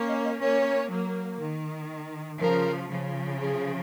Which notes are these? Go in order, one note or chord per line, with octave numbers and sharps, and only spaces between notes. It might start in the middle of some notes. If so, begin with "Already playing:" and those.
Already playing: A#3 C#4
D#5
D#5
A#3 C#4 C#5
F#3 A#3
D#3
C#3 F3 A#4
C#3 F3
G#4